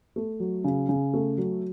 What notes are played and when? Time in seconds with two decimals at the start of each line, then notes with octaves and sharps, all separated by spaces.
0.16 A3
0.40 F#3
0.64 C#3
0.89 C#3
1.14 A3
1.37 F#3